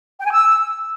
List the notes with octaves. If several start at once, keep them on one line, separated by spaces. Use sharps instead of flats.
G5
G#5
E6